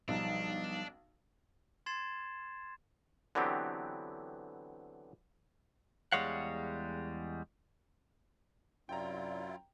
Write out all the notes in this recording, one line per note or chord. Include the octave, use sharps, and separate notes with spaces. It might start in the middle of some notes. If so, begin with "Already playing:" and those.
B1 F3 G3 D4 D#4
C6 G#6 A6 C7 E7
D3 E3 F#3 B3 C4 G4
E2 G3 G#3 C#5 F5 F#5
F#2 C3 F#3 E4 F4 D5 G5 A#5